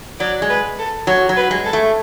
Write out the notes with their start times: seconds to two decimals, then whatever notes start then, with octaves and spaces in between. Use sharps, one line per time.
0.19 F#3 D5
0.42 G#3
0.49 B4
0.78 A4
1.07 F#3 C#5
1.29 F#3
1.36 B4
1.51 G#3
1.65 A4
1.73 A3